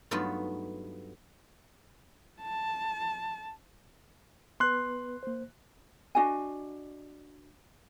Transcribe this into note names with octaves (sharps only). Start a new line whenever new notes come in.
G2 F#3 A3 B3 D#4 F4
A5
B3 B4 C6 F#6
A#3 C5
D4 F#4 D#5 G#5